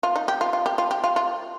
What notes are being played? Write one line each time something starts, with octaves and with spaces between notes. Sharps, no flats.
F4
D#4
G4
F4
F4
G4
F4
G4
F4
F4